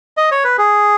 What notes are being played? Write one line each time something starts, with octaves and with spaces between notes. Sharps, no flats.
D#5
C#5
B4
G#4